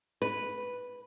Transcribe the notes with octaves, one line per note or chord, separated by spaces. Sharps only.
B4